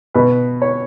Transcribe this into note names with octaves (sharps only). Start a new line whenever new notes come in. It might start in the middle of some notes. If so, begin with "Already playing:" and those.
B2 B4
C#5